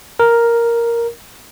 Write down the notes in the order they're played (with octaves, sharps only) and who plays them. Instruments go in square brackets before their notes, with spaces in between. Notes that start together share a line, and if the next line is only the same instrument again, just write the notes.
[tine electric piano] A#4